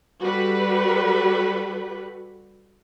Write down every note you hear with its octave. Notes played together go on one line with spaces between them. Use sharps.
G3 F#4 A4 B4